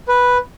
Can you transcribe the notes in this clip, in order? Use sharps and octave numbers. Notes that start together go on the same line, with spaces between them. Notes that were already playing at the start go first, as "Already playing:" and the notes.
B4